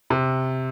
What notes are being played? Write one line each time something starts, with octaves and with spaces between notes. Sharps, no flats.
C3